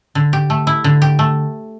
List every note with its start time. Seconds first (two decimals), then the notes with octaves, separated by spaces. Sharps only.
0.15 D3
0.33 G4
0.50 A3
0.67 E4
0.84 D3
1.02 G4
1.19 A3